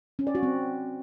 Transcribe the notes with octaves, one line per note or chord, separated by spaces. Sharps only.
C#4
D5
F#4
C4